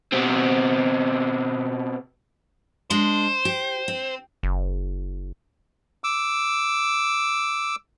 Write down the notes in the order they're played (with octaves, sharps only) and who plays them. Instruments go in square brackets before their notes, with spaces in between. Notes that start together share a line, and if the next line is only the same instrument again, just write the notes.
[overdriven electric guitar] B2 C4
[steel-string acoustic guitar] G#3 D4 [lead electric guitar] C5
[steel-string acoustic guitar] G4
C4
[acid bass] F#1
[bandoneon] D6 E6